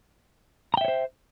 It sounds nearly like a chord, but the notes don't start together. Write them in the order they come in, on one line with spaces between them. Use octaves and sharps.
A#5 G5 E5 C#5 C5